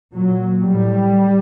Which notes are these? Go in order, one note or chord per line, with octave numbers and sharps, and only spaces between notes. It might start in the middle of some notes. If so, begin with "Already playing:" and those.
A#2 F#3
A2 G3